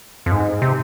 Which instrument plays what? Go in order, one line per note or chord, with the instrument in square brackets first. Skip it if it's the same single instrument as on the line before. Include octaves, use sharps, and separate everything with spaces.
[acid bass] F2
G#2
C3